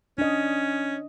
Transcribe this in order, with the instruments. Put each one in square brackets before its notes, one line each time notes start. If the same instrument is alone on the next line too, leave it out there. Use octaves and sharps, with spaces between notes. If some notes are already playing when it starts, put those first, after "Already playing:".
[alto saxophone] C#4 [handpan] D4 D#5